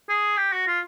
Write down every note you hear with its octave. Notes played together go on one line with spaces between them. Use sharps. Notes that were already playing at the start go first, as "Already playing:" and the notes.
G#4
G4
F#4
F4